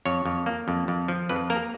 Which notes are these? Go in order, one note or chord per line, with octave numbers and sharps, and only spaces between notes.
F2 C#5
F2
A#3
F2
F2
F3
F2 B4
A#3 A#4